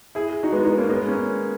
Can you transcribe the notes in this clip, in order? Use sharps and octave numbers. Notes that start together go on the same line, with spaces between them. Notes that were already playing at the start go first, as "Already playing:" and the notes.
E4 G#4
D#4 F#4
G#3 B3
B3 D#4
A#3 C#4
G#3 B3
A#3 C#4